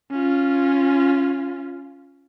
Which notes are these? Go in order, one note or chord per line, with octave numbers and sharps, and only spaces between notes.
C#4 F4